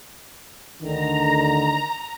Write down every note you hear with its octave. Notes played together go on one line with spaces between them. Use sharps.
D2 D3 D#3 A#5